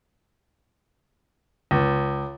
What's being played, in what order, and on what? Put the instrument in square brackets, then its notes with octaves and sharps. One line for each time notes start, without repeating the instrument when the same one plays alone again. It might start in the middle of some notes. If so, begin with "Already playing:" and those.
[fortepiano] C#2